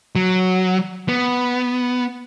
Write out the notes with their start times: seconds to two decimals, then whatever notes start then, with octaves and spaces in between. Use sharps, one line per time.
0.16 F#3
1.08 B3